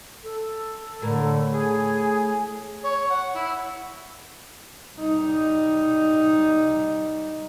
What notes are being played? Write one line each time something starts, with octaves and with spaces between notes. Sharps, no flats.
A4
A2 D3 A#4
G#4 G#5
C#5
F#5
E4
G3 D#4